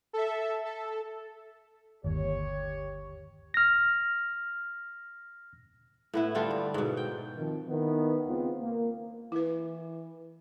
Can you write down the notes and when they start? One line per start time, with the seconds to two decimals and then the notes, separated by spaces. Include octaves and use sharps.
0.13 A4 E5
0.65 A4
2.04 G1 D#2 G4 C#5
3.54 F6 A#6
6.14 A2 B3 E4
6.35 D3 G3 F4 A4
6.51 G2
6.74 G#2 B2
6.97 G5
7.37 D#3 F3 C4
7.69 D#3 B3 E4 B4
8.28 C#2 B3 C4 F4
8.61 A#3
9.32 E3 E4 B4